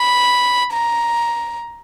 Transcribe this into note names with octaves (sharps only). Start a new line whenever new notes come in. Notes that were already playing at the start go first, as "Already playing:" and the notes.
Already playing: B5
A#5